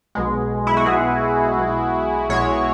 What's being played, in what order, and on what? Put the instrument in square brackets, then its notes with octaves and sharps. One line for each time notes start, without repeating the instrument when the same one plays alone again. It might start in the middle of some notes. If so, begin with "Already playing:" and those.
[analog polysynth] B1 B2 G#3
E4
F#4
B1 B2 G#3 G#4
B1 B2 G#3
B1 B2 G#3 C#5